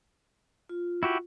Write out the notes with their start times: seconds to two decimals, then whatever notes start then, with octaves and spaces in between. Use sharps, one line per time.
0.69 F4
1.03 E4 F#4 G4